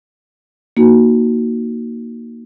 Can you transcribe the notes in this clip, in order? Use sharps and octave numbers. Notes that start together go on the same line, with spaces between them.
A#3 D#4 F#4